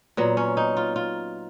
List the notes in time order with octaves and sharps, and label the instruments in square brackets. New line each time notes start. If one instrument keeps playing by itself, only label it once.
[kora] A#2 F#3 B3
C#4
D#4
F4
F4